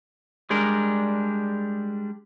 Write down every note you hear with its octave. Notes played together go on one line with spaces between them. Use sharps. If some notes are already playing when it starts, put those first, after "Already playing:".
G3 G#3 D4 A#4